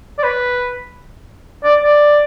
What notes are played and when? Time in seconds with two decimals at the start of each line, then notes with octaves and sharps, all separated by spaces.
0.19 D5
0.23 B4
1.64 D5
1.84 D5